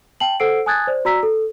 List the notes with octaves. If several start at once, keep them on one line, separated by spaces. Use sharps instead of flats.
G5 A5 F#7
A4 C5 F#5 E6 C7 D7
G#5 A5 D#6 F#6 G#6 A6
C5 D5
F#4 D5 A#5 E6 B6
A4